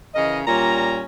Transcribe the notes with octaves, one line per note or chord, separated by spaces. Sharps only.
C#3 E3 A#4 D#5
A#2 G3 C#4 A#5